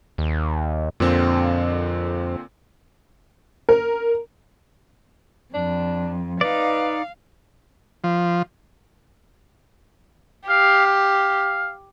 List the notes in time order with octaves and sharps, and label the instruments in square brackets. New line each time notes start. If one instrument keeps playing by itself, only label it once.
[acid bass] D#2
[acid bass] F2 [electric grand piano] A#2 D3 C4
[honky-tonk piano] A#4
[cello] F2 [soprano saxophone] D4
[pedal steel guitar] D#4 D5 [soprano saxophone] B4 [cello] F5
[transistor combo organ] F3
[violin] G4 [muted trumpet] F5
[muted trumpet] F5